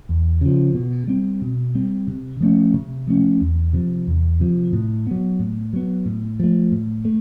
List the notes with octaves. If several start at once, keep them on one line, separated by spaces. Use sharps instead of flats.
E2
C#3 F3
B2
G3 C4
B2
G3 C4
C3
F3 A3 C#4
C3
F3 A3 C#4
E2
C3 F3
E2
C3 F3
A2
F#3 B3
A2
F#3 B3
A2
F3 A3
A2
A3